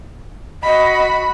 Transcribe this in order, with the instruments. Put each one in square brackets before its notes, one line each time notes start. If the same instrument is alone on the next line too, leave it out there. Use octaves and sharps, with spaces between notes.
[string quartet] F#4 B5 [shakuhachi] D#5